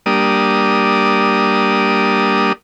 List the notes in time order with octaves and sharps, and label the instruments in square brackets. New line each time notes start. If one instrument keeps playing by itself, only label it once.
[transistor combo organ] G3 A#3 D4 D#6